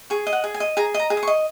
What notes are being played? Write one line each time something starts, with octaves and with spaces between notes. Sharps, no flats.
G#4 C#6
D#5
F#5
G#4
G#5
D#5
G#4 A#5
D#5 A#5
G#4
D#6
C#6
D#5